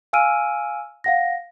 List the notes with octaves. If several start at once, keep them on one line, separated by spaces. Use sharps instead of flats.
F5 G#5 E6 F6 D7 D#7
F5 F#5 A#6